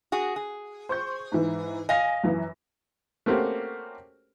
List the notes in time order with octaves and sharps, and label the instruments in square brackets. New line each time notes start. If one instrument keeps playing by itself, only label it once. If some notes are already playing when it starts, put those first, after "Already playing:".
[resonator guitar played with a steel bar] F#4 G#4
G#4
[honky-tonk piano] C5 C#6 G6
G#2 E3
[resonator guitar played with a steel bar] D#5 F5 [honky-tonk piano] G#5 A#6
[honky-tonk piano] F#2 E3
[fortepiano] A3 A#3 C4 C#4 F#4 G4